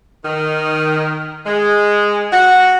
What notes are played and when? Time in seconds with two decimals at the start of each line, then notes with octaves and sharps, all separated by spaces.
0.25 D#3
1.45 G#3
2.33 F#4